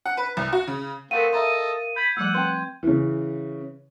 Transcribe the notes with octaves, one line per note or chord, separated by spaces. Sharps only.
F#5
B4
C2
F#4
C#3
A3 B3 C4 A#4 F5 F#5 D#7
A4 D#5 E5 A#5 C6
B5 G6 G#6
F3 G3 A3 F#5 E6
C4 B4 G5 C6
C#3 E3